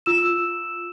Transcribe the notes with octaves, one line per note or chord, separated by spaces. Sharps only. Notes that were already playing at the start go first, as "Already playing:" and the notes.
F4 E6 E7